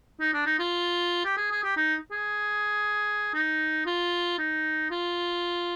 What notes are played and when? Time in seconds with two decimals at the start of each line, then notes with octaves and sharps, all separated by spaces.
0.20 D#4
0.33 D4
0.46 D#4
0.59 F4
1.25 G4
1.37 G#4
1.51 G#4
1.64 G4
1.77 D#4
2.12 G#4
3.34 D#4
3.86 F4
4.38 D#4
4.90 F4